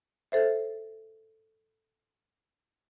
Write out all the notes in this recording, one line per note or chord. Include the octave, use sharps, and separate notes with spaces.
A4 C5 E5